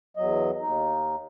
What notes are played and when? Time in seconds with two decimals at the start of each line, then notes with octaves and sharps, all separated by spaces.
0.17 E2 F#3 D#5
0.61 D#2 D#4